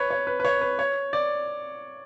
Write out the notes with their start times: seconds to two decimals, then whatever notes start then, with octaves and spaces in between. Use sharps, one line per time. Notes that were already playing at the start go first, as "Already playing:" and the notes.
Already playing: B4 C#5
0.11 C#5
0.27 B4
0.40 B4
0.45 C#5
0.61 B4
0.79 C#5
1.13 D5